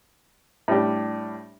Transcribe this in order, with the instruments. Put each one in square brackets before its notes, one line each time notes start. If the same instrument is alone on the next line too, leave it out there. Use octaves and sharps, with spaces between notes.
[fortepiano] A2 G3 D4 G4